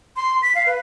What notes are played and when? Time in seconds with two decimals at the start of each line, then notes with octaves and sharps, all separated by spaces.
0.16 C6
0.42 B6
0.55 F5
0.66 B4